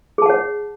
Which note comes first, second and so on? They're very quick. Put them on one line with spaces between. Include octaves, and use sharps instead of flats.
G#4 A5 F#5 C#5